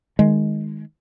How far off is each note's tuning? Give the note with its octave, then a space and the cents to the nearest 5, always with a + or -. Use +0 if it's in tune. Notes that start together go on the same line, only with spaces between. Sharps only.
D#3 +0 G#3 +5